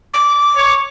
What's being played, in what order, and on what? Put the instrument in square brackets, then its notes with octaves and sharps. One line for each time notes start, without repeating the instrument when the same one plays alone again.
[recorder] D6
[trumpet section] C#5